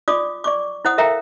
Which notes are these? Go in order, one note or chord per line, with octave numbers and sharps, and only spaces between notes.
F4 D5 D6 D#6
D5 C#6 D6
E4 C5 F#5 D#6
A4 A#4 E5 F5 G5 A#5